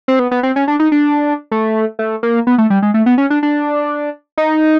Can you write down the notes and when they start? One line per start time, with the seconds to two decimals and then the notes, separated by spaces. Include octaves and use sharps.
0.08 C4
0.19 B3
0.31 B3
0.43 C4
0.56 C#4
0.68 D4
0.80 D#4
0.92 D4
1.52 A3
1.99 A3
2.23 A#3
2.47 B3
2.58 A3
2.70 G3
2.82 G#3
2.94 A3
3.06 B3
3.18 C#4
3.30 D4
3.43 D4
4.38 D#4